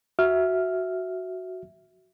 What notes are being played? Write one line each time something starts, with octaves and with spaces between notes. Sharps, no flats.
F#4 E5 F6